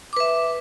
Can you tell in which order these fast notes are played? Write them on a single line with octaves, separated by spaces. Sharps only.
D6 B4 E5